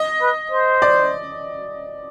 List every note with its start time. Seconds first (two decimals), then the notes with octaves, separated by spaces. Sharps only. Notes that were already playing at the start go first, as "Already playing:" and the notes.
Already playing: D#5
0.21 B4
0.51 C5
0.82 D5